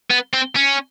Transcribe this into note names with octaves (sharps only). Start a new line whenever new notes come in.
B3
C4
C#4